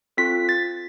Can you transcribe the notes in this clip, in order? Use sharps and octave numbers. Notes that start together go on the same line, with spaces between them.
C4 F4 A4 B6
A6